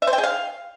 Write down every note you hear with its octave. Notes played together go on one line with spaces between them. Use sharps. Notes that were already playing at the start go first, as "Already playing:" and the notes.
E5
C5
G5
G#4
F5